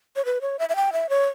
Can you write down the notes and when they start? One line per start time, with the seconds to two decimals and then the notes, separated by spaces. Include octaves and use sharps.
0.16 C#5
0.25 B4
0.41 C#5
0.59 E5
0.69 E5
0.76 G5
0.93 E5
1.09 C#5